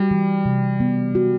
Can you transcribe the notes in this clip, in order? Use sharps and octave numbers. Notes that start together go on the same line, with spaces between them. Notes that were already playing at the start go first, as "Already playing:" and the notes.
Already playing: G3 F#4
E3
C3
B3
F#4